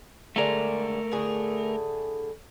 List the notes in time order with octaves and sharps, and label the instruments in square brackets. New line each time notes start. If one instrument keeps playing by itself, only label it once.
[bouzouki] D3 G#3 D5 [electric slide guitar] A3 A#4
[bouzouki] A2 D3 G#4